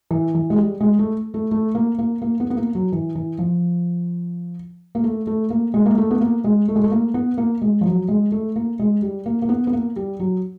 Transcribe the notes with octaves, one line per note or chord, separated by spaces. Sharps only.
E3
E3
G#3
G3
G#3
A3
A3
A3
A#3
A#3
A#3
B3
B3
A#3
F#3
E3
E3
F3
A#3
A3
A3
A#3
G#3
A#3
A3
B3
A#3
G#3
A3
G#3
A3
A#3
B3
A#3
G#3
F3
F#3
G#3
A3
A#3
G#3
G3
A#3
A#3
B3
B3
A#3
G3
F#3